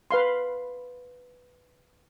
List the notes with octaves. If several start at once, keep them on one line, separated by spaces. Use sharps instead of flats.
B4 F5 C6